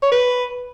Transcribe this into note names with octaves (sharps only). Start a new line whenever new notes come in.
C#5
B4